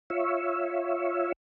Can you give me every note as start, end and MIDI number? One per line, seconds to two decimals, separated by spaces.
0.10 1.32 65
0.10 1.32 73
0.10 1.32 76